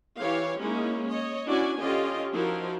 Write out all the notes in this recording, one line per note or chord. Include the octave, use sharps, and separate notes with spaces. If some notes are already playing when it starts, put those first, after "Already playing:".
E3 G4 C#5 F5
G#3 A#3 C#4 D#4 E4
C#5 D#5
C#4 D4 E4 F#4 D5 G#5
D3 C#4 F4 G4 D#5
F3 D#4 E4 F#4 A#4